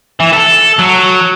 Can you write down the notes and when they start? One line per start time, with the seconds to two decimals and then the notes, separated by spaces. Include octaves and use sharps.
0.20 E3
0.33 A4
0.79 F#3